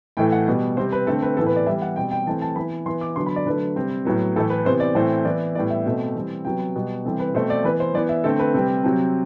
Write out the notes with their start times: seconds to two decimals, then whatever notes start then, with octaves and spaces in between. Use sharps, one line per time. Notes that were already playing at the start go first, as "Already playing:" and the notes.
0.17 A2 E3 A3 G5
0.32 F#5
0.47 B2 G3 B3
0.77 C3 G3 C4 C5
0.92 B4
1.07 D3 A3 C4 A4
1.22 B4
1.37 A2 E3 B3 A4
1.46 B4
1.56 D5
1.66 E3 G3 B3 E5
1.82 F#5
1.96 B2 G3 C4 G5
2.11 G5
2.27 E3 A3 C4 A5
2.42 A5
2.56 E3 B3 B5
2.86 E3 B3 C6
3.01 D6
3.16 D3 F#3 B3 C6
3.26 B5
3.36 D5
3.46 D3 F#3 A3 B4
3.76 C3 G3 C4
4.05 A2 F#3 B3
4.36 A2 E3 A3 A4
4.50 B4
4.65 C3 E3 B3 C5
4.80 D5
4.95 A2 E3 A3 C4 C5
5.25 E3 B3 D5
5.55 A2 G3 B3 D5
5.70 E5
5.86 B2 A3 C4
6.15 E3 G3 C4
6.45 C3 F#3 B3 G5
6.75 B2 G3 B3
7.05 C3 E3 G3 C4 A4
7.19 B4
7.34 B2 A3 C4 C5
7.50 D5
7.64 E3 B3 B4
7.80 C5
7.94 E3 B3 D5
8.09 E5
8.24 D3 A3 C4 A4
8.39 B4
8.54 C3 G3 C4
8.84 C3 F#3 C4